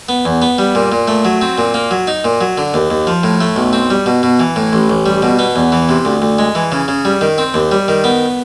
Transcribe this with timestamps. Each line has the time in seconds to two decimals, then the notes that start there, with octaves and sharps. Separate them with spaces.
0.09 B3
0.25 E2
0.42 B3
0.58 G3
0.75 A#2
0.92 A#2
1.08 A3
1.25 F#3
1.41 C4
1.58 A#2
1.74 A#3
1.91 F#3
2.07 D#4
2.24 A#2
2.41 F#3
2.57 D3
2.74 D#2
2.90 D#2
3.07 F3
3.23 A2
3.41 A3
3.56 B1
3.73 C4
3.90 G3
4.06 B2
4.23 B2
4.40 E3
4.56 A2
4.73 A1
4.90 A1
5.06 G3
5.22 B2
5.39 B3
5.56 E2
5.72 E3
5.89 C3
6.05 D2
6.22 D2
6.39 G#3
6.55 E3
6.72 C#3
6.88 C#3
7.05 G3
7.21 D#3
7.38 C4
7.54 D#2
7.71 G3
7.88 D#3
8.04 B3